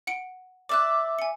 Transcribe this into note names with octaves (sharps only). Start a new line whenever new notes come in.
F#5 C#7 D7
D5 E5 D6 F#6
G#5 C#7